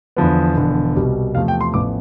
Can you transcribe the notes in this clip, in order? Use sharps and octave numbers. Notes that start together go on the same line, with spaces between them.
E2 D3 F3 B3
E1 E2 D3 F3
C2 B2 G3
E2 C3 F3 A3 F5
G5
C6
A1 A2 F3 B3 D6